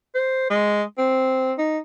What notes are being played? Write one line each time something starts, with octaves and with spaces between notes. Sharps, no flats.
C5
G#3
C4
D#4